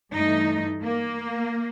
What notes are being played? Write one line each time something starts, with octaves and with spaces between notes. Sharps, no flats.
G2 E3 A3 D#4
A#3